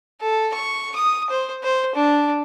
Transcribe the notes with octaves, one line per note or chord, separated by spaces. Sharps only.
A4
C#6
D#6
C5
C5
D4